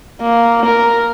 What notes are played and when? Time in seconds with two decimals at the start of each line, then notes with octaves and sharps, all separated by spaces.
0.22 A#3
0.66 A#4